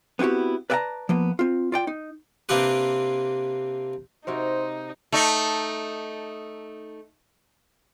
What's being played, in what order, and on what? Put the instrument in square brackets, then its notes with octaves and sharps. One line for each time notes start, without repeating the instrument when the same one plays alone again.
[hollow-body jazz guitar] B3 C4 E4 F#4 G4
B4 D5 E5 G5 A5 A#5
F3 A#3 B3
C4 F4
F4 D5 G5
D#4
[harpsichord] C3 A#3 C4 D4 G4 B4
[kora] C3 F#4 A#4 [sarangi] D#4 [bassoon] C5
[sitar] A3 D#4